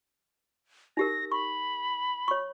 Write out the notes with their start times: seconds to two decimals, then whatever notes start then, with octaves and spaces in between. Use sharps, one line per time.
0.97 D#4 G4 A#4 A#6
1.32 B5 C#6
2.28 C#5 C#6